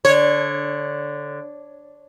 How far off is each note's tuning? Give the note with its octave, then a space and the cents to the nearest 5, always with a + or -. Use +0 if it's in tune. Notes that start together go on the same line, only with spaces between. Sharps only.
D3 -5 C#5 -20